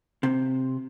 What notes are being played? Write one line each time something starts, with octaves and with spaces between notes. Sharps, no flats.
C3